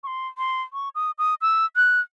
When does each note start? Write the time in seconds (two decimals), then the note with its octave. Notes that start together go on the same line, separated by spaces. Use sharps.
0.04 C#6
0.07 C6
0.38 C6
0.73 C#6
0.95 D#6
1.19 D#6
1.42 E6
1.76 F#6